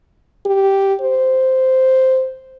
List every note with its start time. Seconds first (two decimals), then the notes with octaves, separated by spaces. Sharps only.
0.46 G4
1.01 C5